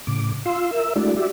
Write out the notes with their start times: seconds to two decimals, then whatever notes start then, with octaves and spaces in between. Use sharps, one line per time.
0.07 A2 C#3 D6
0.46 F4 F5 C6 E6
0.71 A#4 E5 E6
0.96 G#3 A3 D4 E4 F#4 D5
1.17 F#4 G4 D5 E5